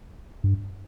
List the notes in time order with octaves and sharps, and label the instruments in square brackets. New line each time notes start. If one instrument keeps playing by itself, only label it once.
[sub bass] G2